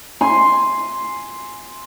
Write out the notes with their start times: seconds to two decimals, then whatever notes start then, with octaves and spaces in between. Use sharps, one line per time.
0.21 G#5 C6